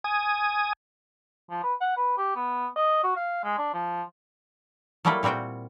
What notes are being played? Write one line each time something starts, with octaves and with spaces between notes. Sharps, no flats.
G#5 D#6
F3
B4
F#5
B4
G4
B3
D#5
F#4
F5
G#3
D4
F3
F#3 G3 A3 A#3 E4 A4
A#2 G3 C4 F#4 G5